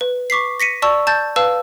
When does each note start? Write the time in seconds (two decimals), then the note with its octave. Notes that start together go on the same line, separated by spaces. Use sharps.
0.01 B4
0.30 C#6 D6 B6 C7
0.60 A#6 B6 C#7 D#7
0.82 D5 A5 C#6 E6
1.07 A5 G6 A6
1.36 B4 F5 A5 E6